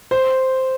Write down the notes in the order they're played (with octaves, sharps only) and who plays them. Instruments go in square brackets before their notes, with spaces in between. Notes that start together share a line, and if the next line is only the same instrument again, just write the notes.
[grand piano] C5